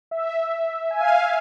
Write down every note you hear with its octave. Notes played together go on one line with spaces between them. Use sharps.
E5
G#5
F5